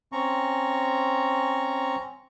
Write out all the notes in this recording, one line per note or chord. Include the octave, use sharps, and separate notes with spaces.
C4 C#4 A#5 C#6